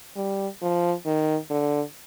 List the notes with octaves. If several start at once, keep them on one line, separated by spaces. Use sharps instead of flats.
G3
F3
D#3
D3